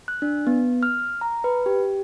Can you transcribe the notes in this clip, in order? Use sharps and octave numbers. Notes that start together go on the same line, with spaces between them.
F#6
D4
B3
F6
A#5
B4
G4